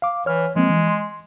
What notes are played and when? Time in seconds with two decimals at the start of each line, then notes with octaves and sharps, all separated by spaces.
0.02 F5 D6
0.26 E3 C#5 F6
0.56 F3 G#3 A#3 C4
0.69 E3
0.88 C6